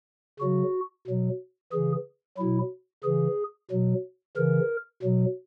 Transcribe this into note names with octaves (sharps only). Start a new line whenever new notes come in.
C#3 F#3 F#4
B2 F#3
C#3 E3 G#4
B2 F#3 E4
C#3 E3 G#4
B2 F#3
C#3 E3 A#4
B2 F#3